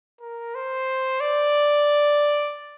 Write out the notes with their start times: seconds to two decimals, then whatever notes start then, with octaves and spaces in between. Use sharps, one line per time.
0.21 A#4
0.55 C5
1.21 D5